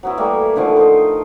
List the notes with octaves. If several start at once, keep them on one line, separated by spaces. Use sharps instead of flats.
F#3 B3 E4
E3 G3 A3 A#3
D3 D#3 F3 A3
C5 D#5